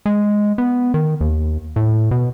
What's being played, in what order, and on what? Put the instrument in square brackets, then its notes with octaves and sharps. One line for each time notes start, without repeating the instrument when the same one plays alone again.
[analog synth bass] G#3
B3
D#3
D#2
A2
B2